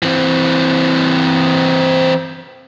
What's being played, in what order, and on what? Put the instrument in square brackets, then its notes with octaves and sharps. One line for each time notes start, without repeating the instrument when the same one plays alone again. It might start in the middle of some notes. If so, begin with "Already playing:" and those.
[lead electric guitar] E3 C4